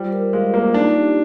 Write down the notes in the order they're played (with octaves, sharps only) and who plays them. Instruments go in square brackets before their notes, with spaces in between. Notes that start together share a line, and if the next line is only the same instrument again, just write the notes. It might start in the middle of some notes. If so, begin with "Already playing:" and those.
Already playing: [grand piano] G3 [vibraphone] F4 C5
[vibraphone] A#4
[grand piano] G#3 [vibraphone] F5
[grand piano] A#3 [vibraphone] F4
[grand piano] D4 [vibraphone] D#4
[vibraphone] G4